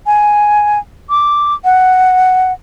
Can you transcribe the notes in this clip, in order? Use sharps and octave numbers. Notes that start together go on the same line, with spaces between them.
G#5
D6
F#5